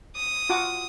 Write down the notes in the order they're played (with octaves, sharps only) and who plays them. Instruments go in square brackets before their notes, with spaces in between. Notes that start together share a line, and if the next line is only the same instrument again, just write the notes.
[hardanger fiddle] D#6
[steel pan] F4 F#4 D6